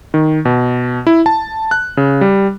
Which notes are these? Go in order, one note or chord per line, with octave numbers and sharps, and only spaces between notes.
D#3
B2
E4
A5
F#6
C#3
G3